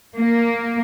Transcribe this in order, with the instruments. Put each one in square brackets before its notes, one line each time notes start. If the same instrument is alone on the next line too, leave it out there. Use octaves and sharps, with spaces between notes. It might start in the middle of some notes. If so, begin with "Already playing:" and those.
[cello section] A#3